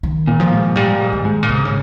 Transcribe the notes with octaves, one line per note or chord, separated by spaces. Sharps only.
D#3
A#2
F3
G#2
A#2 G3
G#2
D#3
G#2
A#2
G#2 C#3
C3
C#3